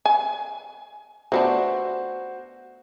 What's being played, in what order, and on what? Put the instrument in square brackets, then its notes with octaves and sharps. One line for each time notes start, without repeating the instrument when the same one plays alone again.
[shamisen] G#5
[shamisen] A3 B3 D4 [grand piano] F#4 C5